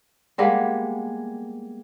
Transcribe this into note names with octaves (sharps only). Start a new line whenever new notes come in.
G3 G#3 A#3 B3